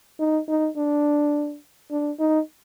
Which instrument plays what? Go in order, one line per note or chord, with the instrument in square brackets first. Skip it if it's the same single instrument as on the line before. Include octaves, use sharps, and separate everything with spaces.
[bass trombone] D#4
D#4
D4
D4
D#4